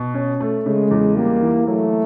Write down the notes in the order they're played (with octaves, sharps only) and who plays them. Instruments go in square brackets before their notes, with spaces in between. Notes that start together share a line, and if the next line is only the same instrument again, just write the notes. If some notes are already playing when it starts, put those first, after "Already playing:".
Already playing: [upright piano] B2
C#4
A3
[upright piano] C#3 [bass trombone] G#3
[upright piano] E2
[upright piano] G3 [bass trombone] A#3
[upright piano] E3
[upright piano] F#3 [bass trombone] A3